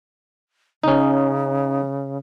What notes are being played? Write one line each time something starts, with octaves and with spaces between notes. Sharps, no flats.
C#3 C#4 D#4